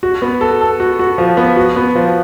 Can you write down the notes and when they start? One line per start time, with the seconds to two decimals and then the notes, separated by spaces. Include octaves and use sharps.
0.03 F#4
0.22 B3
0.41 A4
0.61 A4
0.80 F#4
0.99 F#4
1.18 F3
1.37 B3
1.56 F#4
1.76 B3
1.95 F3